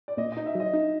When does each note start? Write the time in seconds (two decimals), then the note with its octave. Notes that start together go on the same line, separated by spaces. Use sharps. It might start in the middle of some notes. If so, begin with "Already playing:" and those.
0.08 D5
0.17 A#2 D#5
0.32 D#5
0.37 D#4
0.46 E5
0.55 F#3 D#5
0.74 D#4